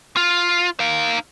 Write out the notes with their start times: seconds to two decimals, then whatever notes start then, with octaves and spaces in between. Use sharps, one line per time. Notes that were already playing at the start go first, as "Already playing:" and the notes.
0.17 F4
0.80 D#4 F5